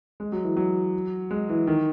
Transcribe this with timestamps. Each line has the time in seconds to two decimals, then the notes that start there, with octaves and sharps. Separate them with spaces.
0.20 G#3
0.32 F#3
0.44 E3
0.57 F#3
1.31 G#3
1.49 E3
1.67 D#3